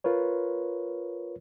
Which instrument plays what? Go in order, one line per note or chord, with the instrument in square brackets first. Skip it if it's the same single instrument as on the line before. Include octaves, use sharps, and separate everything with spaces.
[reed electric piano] F4 A#4 B4 C#5